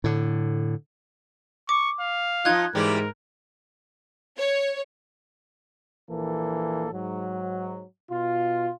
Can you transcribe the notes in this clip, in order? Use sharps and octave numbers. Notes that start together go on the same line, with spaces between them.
A2 D3
C#6 D6
F5
F3 D#4 F4 F#6 G#6
G#2 E3 G3 G4 A#4
C#5
A#1 E3 A#3 A4
G#2 F#3
B2 F4